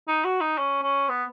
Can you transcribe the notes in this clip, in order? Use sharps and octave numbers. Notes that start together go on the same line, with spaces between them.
D#4
F#4
D#4
C#4
C#4
B3